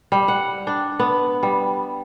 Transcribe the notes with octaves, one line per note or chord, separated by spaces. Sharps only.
G3
F#5
D4
B3
G3